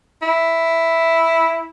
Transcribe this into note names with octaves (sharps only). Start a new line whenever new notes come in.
E4